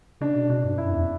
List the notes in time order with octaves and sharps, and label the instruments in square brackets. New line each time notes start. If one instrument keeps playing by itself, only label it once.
[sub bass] C#3 [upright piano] D4
[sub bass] B2
[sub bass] B2 [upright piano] D4
[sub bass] G2
[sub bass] F#2 [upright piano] E4
[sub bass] E2